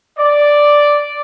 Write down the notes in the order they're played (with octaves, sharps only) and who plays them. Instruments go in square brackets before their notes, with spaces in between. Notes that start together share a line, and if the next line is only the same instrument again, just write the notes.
[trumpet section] D5